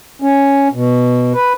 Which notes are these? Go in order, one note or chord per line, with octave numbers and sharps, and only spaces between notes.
C#4
B2
B4